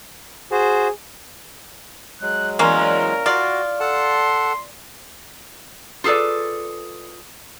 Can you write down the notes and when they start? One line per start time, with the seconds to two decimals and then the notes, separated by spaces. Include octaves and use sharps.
0.51 F#4 G#4 C5
2.22 F#3 G#3 F#6
2.59 E2 A#3 C#4 A#4
3.26 F4 F#4 D5
3.80 A4 F#5 A5 C6
6.04 F4 G#4 A4 B4 D5